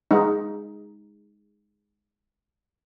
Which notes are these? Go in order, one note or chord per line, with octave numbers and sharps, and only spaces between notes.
G#3 D#4